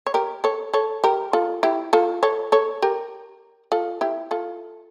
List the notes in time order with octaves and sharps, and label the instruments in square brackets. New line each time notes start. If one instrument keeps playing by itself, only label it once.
[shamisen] C#5
G4 A#4
A4 C#5
A4 C#5
G4 A#4
F4 A4
E4 G4
F4 A4
A4 C#5
A4 C#5
G4 A#4
F4 A4
E4 G4
F4 A4